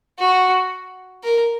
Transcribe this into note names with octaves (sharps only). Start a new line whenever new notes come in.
F#4
A#4